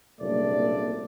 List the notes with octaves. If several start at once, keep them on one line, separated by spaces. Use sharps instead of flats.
F#1 C2 A#2 A3 D4 D5